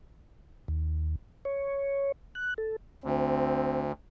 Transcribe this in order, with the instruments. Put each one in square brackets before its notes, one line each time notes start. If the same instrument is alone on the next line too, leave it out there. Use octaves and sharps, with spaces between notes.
[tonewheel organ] D#2
C#5
F#6
A4
[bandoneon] D2 [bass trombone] C4